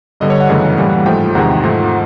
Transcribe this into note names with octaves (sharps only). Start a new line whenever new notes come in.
G2 D3 G3 B3 D#5
C#5
F#5
F#2 C#3 E3 A3
A2 E3 G3 A#3
G#2 F3 A3 G5
E2 C3 D#3 G#3 F#5
G#2 F3 A3